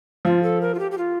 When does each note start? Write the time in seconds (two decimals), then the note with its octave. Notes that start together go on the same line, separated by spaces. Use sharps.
0.25 F3 F4
0.43 A4
0.61 A#4
0.75 F4
0.79 G4
0.91 G4
0.98 F4